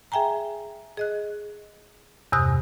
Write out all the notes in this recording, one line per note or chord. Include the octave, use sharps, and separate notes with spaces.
G#4 E5 G5 G#5 A#5
G#4 D#5 F#6
E2 G2 C3 D#6 F#6